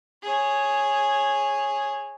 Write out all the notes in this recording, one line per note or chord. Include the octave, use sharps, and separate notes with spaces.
G#4 C#5